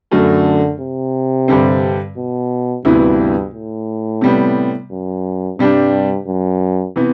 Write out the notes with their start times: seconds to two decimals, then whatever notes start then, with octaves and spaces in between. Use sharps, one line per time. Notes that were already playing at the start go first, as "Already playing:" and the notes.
0.12 F#2 D3 F#3 A3
0.81 C3
1.48 G2 D3 G3 C4
2.17 B2
2.85 D2 G2 C3 E3 B3 E4
3.54 A2
4.21 C3 G3 B3
4.91 F#2
5.59 G2 C3 G3 D4
6.27 F#2
6.96 C3 E3 B3